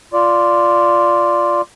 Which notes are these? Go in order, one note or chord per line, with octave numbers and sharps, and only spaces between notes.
F4 D5